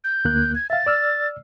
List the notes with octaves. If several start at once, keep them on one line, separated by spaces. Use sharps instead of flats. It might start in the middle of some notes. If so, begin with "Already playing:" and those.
G6
D2 A#3 F#6
G#6
E5 F5 A6
D5 E6 F6